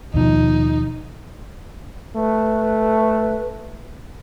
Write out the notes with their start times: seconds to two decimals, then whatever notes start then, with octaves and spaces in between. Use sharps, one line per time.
0.14 D#2 B2 F3 D#4
2.16 A3 B4